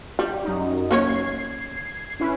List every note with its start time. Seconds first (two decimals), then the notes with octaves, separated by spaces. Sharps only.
0.19 G3 G4
0.44 F#2 D#4
0.91 A#3 C#4 C#5
1.05 G#6 C7
2.20 C#4 E4 B4